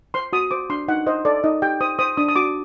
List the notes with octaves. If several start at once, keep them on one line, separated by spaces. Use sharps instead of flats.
C5 C6
F#4 D#6
C5 D6
D4 C6
D#4 F#5
C5 D#5
A4 D5
D#4 D#5
G4 G5
C5 D#6
C5 D#6
D4 D#6
D#6
F#4 D6